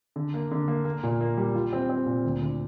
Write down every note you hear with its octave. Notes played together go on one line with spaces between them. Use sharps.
D3
A#3
D3
A#3
A#3
A#2
A#3
G3
F4
C4
C4
A#2
D2
D3